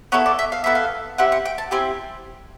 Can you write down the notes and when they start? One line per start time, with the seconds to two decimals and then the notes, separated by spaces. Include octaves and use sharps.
0.12 B3 E4 A4 C#5
0.26 D5
0.39 E5
0.52 F5
0.64 B3 E4 A4 E5
0.75 F5
1.18 C4 E4 G4 F#5
1.32 F#5
1.45 G5
1.58 A5
1.71 C4 E4 G4 G#5